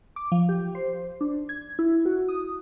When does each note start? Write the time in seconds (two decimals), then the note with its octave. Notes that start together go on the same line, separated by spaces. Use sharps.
0.16 D6
0.32 F3
0.49 G4
0.75 C5
1.21 D4
1.49 G#6
1.79 E4
2.06 F#4
2.29 D#6